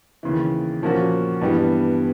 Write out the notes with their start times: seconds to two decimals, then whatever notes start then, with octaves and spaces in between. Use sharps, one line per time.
0.23 D#2 C#3 E3
0.82 A#2 F3 A#3 C#4 F#4
1.41 G2 E3 G3 B3